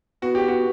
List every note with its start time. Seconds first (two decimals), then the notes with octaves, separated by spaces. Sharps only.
0.22 B3 F#4
0.35 G4
0.48 F#4